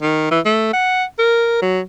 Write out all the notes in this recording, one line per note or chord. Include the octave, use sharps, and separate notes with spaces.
D#3
E3
A3
F#5
A#4
F#3